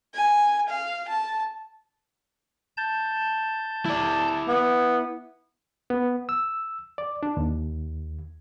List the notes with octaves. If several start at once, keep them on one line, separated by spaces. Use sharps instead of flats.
G#5
F5
A5
A5 G6
E4 D5
B3
B3
E6
D5
D4
D#2